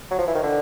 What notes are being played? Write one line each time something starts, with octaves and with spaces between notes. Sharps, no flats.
F#3
F3
E3
D#3
D3